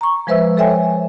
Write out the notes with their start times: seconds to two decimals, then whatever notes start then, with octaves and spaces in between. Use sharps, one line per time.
0.01 A#5 C#6
0.27 F3 G#3 B4 C5 E5 E6
0.57 A4 C5 C#5 E5 G5 G#5